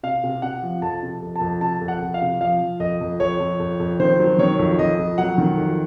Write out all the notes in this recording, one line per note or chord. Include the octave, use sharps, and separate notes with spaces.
C3 F5
C3
C3 F#5
F3
F2 A5
C3
F2
A5
F2
C3 A5
F2
F#5
F2
F5
C3
F3 F5
F3
F2 D#5
F2
F2 C#5
F2
F2
F2
D#3 C5
F#3
D#3 C#5
F2
F2 D#5
F2
F#3 F#5
D#3
F2